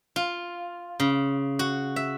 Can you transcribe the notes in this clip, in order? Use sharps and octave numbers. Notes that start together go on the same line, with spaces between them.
F4
C#3
F#4
E5